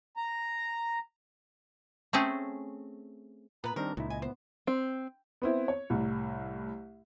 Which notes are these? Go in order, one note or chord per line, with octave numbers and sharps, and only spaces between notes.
A#5
A3 C4 C#4 G#4
A#2 B3 B4 A#5
D#3 G3 C4 D4 A#4
C#2 A#2 F#3 D#4 E4
D#5 G#5
B3 C5
C4
B3 C4 E4
C#5
C2 A2